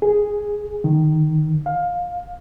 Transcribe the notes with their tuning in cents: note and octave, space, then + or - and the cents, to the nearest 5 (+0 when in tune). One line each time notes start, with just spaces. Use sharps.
G#4 +0
D#3 -5
F5 +20